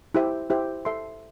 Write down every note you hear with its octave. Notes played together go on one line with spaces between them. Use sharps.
E4 G4 C5 E5
E4 G4 C5 E5
A4 E5 C6